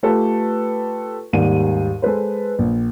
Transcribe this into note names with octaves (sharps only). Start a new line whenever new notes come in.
A3 F4 G4 A4 B4
D#2 G#2 G3 A#4 D5 D#7
G#3 A4 B4 C5
A#1